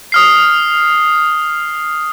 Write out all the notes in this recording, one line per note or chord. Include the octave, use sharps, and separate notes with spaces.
D#6 F6 C7